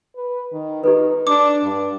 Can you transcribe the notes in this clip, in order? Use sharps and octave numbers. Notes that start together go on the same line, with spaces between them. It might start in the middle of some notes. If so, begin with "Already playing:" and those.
B4
D#3
D#4 G4 A4 B4
D4 D6
G2